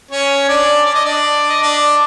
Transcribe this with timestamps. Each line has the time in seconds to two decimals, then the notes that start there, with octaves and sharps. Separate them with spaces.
0.11 C#4 C#5
0.48 D4 D5
0.86 D5
0.95 D#5
1.05 D4 D5
1.49 D#5
1.61 D4 D5